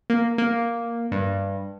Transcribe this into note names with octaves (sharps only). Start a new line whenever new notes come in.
A#3
A#3
G2